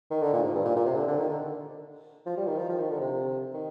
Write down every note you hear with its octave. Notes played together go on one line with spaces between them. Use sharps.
D#3
D3
A#2
G#2
G2
A#2
A#2
C3
D3
D3
D#3
D3
F3
G3
D#3
F3
F3
D#3
D3
C3
D#3